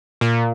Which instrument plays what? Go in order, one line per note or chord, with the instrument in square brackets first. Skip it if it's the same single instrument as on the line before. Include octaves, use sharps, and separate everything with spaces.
[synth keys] A#2